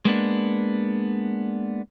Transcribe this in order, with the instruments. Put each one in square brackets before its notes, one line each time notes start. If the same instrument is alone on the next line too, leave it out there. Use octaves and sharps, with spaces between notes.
[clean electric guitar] G#3 A#3 B3 D4